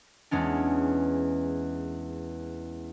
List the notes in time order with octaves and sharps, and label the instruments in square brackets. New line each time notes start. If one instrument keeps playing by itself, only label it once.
[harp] E2 G#3 C#4 D4